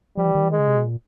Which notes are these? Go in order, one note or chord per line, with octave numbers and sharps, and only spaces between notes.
F3 G3
E3
D#3
E3
D#3 G#3
C#3
C3
B2
A#2